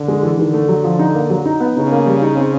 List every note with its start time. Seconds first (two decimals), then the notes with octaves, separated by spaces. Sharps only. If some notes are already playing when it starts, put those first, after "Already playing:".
Already playing: D3
0.08 G#3
0.23 E3
0.38 D3 D#3
0.54 A3
0.69 F#3
0.84 F3
0.99 D#4
1.15 A#3
1.30 F#3
1.46 D#4
1.60 B3
1.76 C#3 D#4
1.92 A#3
2.06 G3
2.22 D#4
2.36 C4